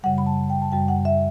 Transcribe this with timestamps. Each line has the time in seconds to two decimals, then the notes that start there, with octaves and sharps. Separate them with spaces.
0.04 F#2 C#3 G3 F#5
0.18 B5
0.26 A5
0.50 G5
0.62 A5
0.72 F#2 C#3 G3 G5
0.88 F#5
1.05 E5